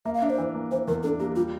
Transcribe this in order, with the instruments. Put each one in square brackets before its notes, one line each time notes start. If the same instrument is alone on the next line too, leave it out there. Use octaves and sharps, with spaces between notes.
[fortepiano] A#3 [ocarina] E5
[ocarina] F5
[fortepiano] D4 [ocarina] E5
[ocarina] C5
[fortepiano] E3
A#3
[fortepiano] E3 [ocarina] C5
[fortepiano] E2 [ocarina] A#4
[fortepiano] D4 [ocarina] A4
[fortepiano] A#3 [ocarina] G4
[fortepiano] G3 [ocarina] F4